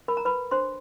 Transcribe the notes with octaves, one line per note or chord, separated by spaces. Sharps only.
A#4 B5
A#5
B4 B5
D4 C5 C6